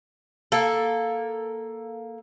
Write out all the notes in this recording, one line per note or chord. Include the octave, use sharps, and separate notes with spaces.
A#3 A4